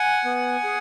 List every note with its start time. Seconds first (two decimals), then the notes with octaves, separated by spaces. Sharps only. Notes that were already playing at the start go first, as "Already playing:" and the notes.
Already playing: F#5 G#5
0.25 B3
0.64 G#4